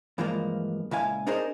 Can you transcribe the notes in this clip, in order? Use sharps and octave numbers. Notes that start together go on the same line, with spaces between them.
G2 E3 F3 G#3 A#3
C#2 A#2 E4 F5 G#5
D4 D#4 G#4 A#4 C5 D#5